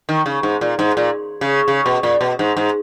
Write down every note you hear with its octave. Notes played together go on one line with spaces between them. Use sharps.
D#3
C#3
G#2
A#2
G#2
A#2
C#3
C#3
B2
A#2
B2
G#2
G#2